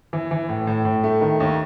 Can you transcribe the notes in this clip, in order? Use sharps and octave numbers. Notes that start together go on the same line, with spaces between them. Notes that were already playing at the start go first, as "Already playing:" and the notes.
E3
E3
A2
A2
A2
A3
D#3
D#2